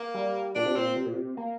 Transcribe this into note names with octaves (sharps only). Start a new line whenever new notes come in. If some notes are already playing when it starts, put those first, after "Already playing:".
Already playing: A#3
G3
A#2 D4
C3
A#2 C4
C3
A#2
C3
A#3